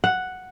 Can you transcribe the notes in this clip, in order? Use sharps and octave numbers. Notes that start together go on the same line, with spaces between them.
F#5